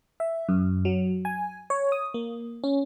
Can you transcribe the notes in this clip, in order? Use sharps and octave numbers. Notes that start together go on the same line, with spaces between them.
E5
F#2
F#3
G#5
C#5
D#6
A#3
C#4